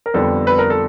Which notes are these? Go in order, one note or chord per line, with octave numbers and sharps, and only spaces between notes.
A#4
F2 D3 G3 B3 A4
B4
A#4
A4